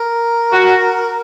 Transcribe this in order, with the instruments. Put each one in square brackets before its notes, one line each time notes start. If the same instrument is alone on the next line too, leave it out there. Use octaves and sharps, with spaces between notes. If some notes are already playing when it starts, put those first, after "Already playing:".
Already playing: [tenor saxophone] A#4
[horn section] F#4